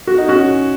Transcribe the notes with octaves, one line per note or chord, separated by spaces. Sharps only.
F#4
D#4
C#4 F#4